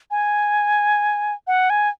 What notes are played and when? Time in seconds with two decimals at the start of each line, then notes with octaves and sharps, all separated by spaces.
0.11 G#5
1.47 F#5
1.70 G#5